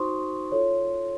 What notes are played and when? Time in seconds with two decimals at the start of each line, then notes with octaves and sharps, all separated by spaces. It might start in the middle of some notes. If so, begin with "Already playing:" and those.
Already playing: D#4 F#4 C5 C6 C#6 D#6
0.52 F4 A4 C#5